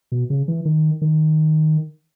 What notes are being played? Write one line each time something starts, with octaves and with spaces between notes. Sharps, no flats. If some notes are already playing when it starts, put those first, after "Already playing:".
B2
C#3
E3
D#3
D#3